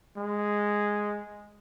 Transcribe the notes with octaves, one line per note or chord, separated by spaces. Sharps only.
G#3